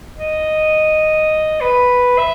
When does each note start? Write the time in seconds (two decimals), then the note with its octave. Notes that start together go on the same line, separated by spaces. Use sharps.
0.19 D#5
1.61 B4
2.18 E5